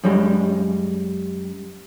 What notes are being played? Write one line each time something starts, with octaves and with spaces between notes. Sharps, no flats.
F#2 G3 G#3